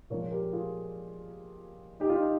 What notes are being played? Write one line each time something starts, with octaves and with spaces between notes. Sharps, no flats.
A#2 F3 G#3 A#4 C#5
G4 A#4
F4 G#4
D#4 G4
F4
D#4